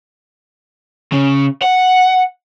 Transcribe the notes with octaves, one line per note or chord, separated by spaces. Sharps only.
C#3
F#5